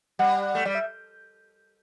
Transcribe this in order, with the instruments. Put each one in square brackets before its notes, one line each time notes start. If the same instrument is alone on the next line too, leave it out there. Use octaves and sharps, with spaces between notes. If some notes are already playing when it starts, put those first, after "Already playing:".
[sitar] G3 [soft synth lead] F#5
[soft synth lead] F#5
[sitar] A3
[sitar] G3 [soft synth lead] D5
[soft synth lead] E5